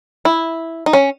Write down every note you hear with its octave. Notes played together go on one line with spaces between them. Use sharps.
E4
D#4
C#4